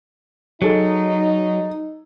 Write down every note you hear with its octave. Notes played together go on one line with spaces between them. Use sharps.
F#3 D#4 G#4 A4